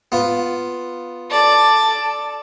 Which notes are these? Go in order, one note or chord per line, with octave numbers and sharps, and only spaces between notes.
B3 F4
A4 D5 A5